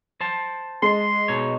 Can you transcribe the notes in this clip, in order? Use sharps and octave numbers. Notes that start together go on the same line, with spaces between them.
C5 A5
G#3 C6
B2 D#4 C#5